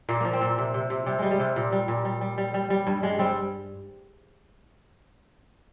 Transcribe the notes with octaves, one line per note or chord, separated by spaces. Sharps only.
A#2 A#3
F3 A#3
C4
A#2
C3
C3
C3
C3 G3
G3 G#3
G3
C3
A#2
G3
A#2
G3
G3
G3
G3
G3
G2
G3 G#3
G3 C4